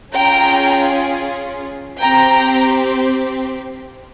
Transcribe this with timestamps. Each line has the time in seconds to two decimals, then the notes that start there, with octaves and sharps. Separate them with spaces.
0.14 C#4 F4 G#4 G5 A#5
2.01 C4 G4 G5 A#5